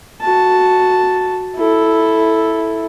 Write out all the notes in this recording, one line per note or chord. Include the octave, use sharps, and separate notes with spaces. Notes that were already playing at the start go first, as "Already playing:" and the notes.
F#4 A5
E4 A4